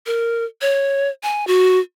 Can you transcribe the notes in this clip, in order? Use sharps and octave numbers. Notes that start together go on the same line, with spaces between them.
A#4
C#5
G#5
F#4